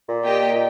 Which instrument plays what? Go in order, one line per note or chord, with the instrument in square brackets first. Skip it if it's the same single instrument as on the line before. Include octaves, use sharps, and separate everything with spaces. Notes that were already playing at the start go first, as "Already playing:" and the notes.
[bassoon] A#2
[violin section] A#3 G4 D#5 G5
[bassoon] A#2